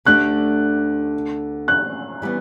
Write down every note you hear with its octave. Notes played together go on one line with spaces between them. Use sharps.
D2 D3 A3 D4 G4 F#6
F#6
E3 G3 B3